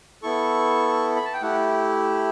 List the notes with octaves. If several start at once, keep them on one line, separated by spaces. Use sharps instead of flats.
B3 E4 A4 C#6
B5
A5
G5
A3 E4 G4 F#5